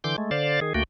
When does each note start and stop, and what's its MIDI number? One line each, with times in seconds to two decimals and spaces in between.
0.04 0.16 50
0.04 0.16 52
0.04 0.16 84
0.04 0.16 86
0.04 0.16 91
0.18 0.30 56
0.18 0.30 57
0.31 0.60 50
0.31 0.60 72
0.31 0.60 74
0.31 0.60 77
0.31 0.60 93
0.61 0.73 51
0.61 0.73 68
0.74 0.83 38
0.74 0.83 57
0.74 0.83 58
0.74 0.83 66
0.74 0.83 79